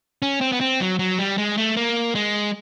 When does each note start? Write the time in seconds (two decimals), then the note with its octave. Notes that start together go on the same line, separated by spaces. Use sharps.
0.22 C#4
0.41 C4
0.52 B3
0.60 C4
0.80 F#3
0.99 F#3
1.19 G3
1.38 G#3
1.57 A3
1.77 A#3
2.15 G#3